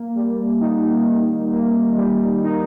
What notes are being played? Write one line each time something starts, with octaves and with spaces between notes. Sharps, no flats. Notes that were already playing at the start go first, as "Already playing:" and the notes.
Already playing: A#3
G3
D#4
D#3
A#3
G3
D#4